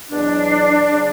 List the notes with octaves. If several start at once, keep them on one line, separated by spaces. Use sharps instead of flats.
E2 B2 F#3 D4
C#3 F#3